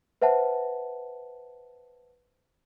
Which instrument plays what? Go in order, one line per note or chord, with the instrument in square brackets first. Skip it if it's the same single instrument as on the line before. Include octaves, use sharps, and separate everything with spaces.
[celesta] B4 C5 E5 F#5 A5